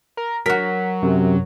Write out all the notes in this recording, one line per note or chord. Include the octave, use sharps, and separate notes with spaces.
A#4
F#3 F#4 A#4 B6
F#2 C3